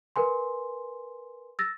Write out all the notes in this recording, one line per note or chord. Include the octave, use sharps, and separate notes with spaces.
A#4 B4 G#5 C6
E6 A6 A#6